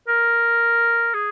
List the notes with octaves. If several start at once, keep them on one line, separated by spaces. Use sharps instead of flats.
A#4
G#4